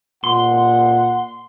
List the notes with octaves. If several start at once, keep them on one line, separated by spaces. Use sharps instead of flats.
A#2 F#5 C6